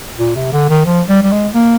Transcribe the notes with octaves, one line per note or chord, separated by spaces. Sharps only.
A#2
C3
D3
D#3
F3
G3
G3
G#3
A#3